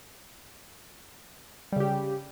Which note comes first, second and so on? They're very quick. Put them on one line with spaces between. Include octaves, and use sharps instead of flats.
G3 C#3 G4